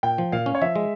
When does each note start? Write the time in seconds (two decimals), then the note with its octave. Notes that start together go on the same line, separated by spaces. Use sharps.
0.03 A#2 G5
0.18 F3
0.32 A#2 F5
0.46 C#4
0.55 C#5
0.61 F3 E5
0.75 G#3